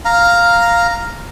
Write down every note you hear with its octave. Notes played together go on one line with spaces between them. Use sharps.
F5 A#5